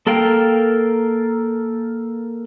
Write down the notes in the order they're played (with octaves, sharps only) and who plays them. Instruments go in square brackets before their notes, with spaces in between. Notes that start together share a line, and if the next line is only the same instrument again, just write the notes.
[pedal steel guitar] A#3 A4 A#4 F5 G5